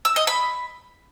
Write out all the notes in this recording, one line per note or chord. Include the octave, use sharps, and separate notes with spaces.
E6
D#5
B5